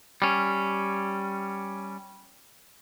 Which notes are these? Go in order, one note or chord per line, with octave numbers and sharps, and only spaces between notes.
G3 C#4